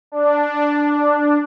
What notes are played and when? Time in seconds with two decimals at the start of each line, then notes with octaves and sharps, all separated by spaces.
0.12 D4